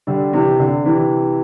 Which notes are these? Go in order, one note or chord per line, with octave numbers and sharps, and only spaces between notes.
D3 G3
C3 E3
D3
C3 E3